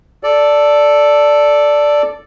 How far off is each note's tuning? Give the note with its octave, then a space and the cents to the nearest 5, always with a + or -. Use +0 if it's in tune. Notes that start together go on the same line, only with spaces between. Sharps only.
A4 +0 D5 +0